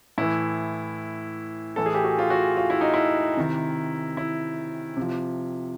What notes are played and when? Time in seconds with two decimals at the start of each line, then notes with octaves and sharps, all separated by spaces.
0.18 A2 E3 E4
1.76 A2 E3 A4
1.86 G#4
1.94 G4
2.04 F#4
2.19 F4
2.30 F#4
2.57 F4
2.70 E4
2.81 D#4
2.94 E4
3.37 C3 D#3
4.17 E4
4.97 C3 F3